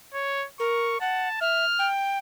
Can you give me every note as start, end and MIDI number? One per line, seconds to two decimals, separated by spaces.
0.14 0.46 73
0.60 0.99 70
0.60 0.98 85
1.00 1.28 78
1.00 1.38 81
1.41 1.65 76
1.41 1.88 89
1.79 2.18 79